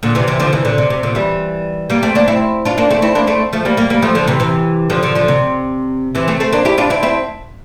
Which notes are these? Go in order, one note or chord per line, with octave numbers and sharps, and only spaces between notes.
A#2 D3
C3 E3
C3 E3
D3 F3
C3 E3
A#2 D3
C3
C3
A#2 D3
E3 G3
G3 A#3
A3 C4
A#3 D4
C4 E4
D4 F4
A#3 D4
A3 C4
C4 E4
A#3 D4
A3 C4
F3 A3
G3 A#3
G3 A#3
G3 A#3
F3 A3
D3 F3
C3 E3
C3 E3
D3 F3
D3 F3
D3 F3
C3
C3 E3
A3 C4
A3 C4
A#3 D4
E4 G4
D4 F4
C4 E4
C4 E4